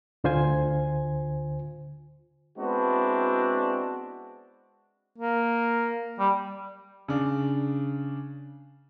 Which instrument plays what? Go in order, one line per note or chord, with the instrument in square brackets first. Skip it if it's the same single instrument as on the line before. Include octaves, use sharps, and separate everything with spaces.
[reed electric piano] D2 D3 F4 C5 G#5 G#6
[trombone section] G#3 B3 C4 D4 E4 F#4
[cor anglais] A#3
G3
[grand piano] C#3 D4